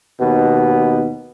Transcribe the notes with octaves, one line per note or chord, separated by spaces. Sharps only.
D#2 B2 B3